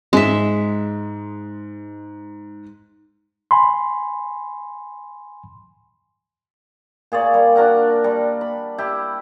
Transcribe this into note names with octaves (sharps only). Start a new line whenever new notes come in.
G#2 G#3 E5
G#5 B5 C6
A#2 G#4 C#5 D5
G3
D4 F#4 A#4 F#5
G3
B5
E4 G4